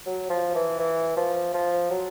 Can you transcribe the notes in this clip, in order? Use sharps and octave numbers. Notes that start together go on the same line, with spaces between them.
F#3
F3
E3
E3
F3
F3
F#3